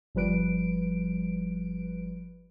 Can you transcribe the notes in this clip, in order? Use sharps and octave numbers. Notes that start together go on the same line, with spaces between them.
G1 F3 G3 B4 D7